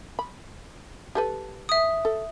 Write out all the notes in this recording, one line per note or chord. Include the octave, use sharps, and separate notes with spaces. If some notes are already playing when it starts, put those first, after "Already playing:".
B5
G4 A4 B4
E5 D#6
A4